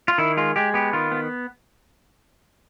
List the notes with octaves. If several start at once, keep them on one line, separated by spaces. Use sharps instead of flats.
F4
D#3 E4
G#3 F4
G#3 G4
B3 G4
D#3 F4
B3